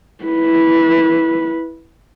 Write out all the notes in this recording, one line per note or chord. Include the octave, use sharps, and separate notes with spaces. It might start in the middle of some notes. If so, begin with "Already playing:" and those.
E4 B4